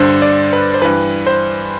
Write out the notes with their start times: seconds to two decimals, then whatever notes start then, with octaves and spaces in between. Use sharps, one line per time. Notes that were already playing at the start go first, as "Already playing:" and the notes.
Already playing: G2 D3 C5
0.22 D5
0.53 B4
0.74 C5
0.82 G2 E3 B4
1.27 C5